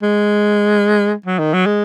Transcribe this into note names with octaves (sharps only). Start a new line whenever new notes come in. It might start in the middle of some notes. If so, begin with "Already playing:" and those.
G#3
F#3
D#3
F#3
G#3